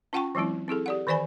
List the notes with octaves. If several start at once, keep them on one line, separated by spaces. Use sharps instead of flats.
C#4 F4 F#5 G5 A5 C#6
E3 F#3 G#3 C4 E4
C4 E4 G#4 A4
G4 D5 F#5
D#3 E3 C5 D5 G#5 B5